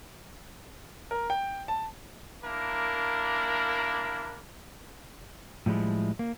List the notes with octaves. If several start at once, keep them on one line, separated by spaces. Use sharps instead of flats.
A#4
G5
A5
A#3 D4 E4 A#4
A2 F3 G3 G#3 E4
A#3